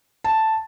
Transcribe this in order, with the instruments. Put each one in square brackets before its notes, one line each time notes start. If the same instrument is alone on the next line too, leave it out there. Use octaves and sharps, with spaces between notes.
[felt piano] A5